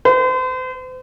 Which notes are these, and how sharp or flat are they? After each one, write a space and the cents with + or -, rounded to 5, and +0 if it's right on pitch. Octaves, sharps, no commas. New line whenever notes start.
C5 -40